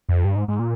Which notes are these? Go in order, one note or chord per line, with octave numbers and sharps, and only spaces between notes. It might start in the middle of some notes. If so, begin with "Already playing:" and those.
F2
G2
G#2
G#2
A#2